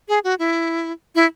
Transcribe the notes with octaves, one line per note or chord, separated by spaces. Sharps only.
G#4
F#4
E4
E4